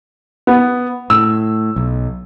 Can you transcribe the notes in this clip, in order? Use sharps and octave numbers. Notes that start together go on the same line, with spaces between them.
B3
A2 E6
B1